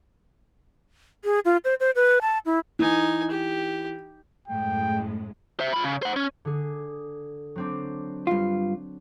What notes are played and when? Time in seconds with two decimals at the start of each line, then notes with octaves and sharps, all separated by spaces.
1.25 G#4
1.45 F4
1.65 C5
1.80 C5
1.96 B4
2.22 A5
2.46 E4
2.79 E3 D#4 G#5
3.30 G4
4.48 F#2 A2 G#3 G5
5.60 C5 E5
5.73 F4 B5
5.84 C#3
6.02 C5 F#5
6.16 C#4
6.45 D3 G#4
7.56 F#3 C4 D4
8.27 G2 F4